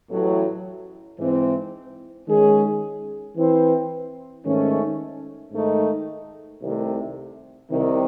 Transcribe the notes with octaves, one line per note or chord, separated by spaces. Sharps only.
A1 A2 F#3
G#2 E3 C4
D#3 G#3 C#4 G#4
E3 C4 E4 C5
G#2 D#3 A3 C#4
G#2 D#3 A3 D#4
C2 C3 D#3 A3
C2 C3 D#3